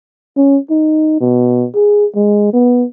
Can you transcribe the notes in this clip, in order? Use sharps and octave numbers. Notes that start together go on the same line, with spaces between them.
C#4
D#4
B2
G#4
G#3
B3